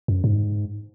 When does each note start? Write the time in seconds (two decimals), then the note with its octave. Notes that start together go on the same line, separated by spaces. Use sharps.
0.08 F#2
0.24 G#2